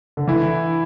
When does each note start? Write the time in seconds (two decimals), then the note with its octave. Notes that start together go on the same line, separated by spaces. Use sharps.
0.17 D3
0.28 E3 E4